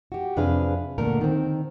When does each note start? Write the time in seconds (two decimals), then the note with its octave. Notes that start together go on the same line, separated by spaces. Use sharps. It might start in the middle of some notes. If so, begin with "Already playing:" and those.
0.12 F#4 G4
0.37 F2 C3 D4 G#4 B4 F5
0.98 D2 A#2 D3 A3 A#4
1.21 D#3 C4